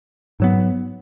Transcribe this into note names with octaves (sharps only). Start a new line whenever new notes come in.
G#2 F#3 B3